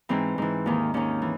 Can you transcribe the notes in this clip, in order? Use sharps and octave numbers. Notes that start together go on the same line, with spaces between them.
G#2 E3 C4
G#2 E3
D#2 D#3
D#2 D#3 C#4
E3